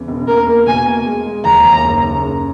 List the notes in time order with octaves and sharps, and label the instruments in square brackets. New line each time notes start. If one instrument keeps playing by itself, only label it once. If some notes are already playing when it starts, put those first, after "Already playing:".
Already playing: [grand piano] E2 C#3
E1
[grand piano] A#3 [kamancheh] A#4
[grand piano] A#3
[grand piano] B2 [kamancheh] G#5
[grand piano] A#3
G#3
G#3
[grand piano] D#2 [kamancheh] A#5
[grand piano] D#2
F#1
C#3
C#3